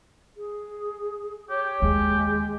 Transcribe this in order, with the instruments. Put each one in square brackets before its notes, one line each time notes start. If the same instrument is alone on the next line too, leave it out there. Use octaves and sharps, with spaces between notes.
[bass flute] G#4
[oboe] G4 [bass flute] C#5
[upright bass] D#2 [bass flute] G#3